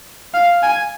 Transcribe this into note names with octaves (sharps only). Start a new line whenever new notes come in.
F5
G#5